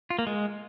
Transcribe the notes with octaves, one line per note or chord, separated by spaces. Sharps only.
F4
A#3
G#3